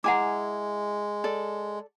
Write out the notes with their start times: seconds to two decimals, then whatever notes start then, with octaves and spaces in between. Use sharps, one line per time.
0.04 G#3 E4 F#5 G#5 A#5 D6
1.24 A4 D5